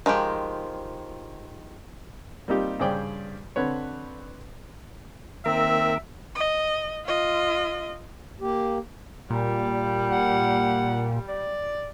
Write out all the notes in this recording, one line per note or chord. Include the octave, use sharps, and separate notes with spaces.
D#3 F3 G#3 G4
G3 A#3 C4 D#4 F4 G4
G2 C#3 G#4 C5 D5 G5
D3 C4 B4 C#5
D#3 A#3 C4 A#4 E5
D#5
F4 D#5
A#3 G4
A#2 G3
F#5
D5